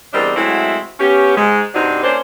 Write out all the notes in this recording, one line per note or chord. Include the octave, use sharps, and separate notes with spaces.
E2 G3 C4 D4 A#4 D#5
F#3 G#3 A3 C4 E4 F#4
B3 C#4 G4
G#2 G#3
G2 C3 C4 D4 D#4 F#4
A#3 C#4 D4 C5